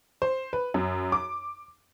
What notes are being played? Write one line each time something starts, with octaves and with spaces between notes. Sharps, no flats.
C5
B4
F#2
D6